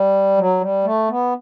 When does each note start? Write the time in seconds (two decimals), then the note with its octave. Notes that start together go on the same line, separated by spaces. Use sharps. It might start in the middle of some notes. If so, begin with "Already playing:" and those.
Already playing: G3
0.37 F#3
0.61 G3
0.84 A3
1.09 B3